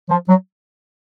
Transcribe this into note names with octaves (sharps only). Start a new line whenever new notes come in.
F3
F#3